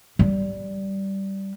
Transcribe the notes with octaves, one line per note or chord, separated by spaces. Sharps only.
G3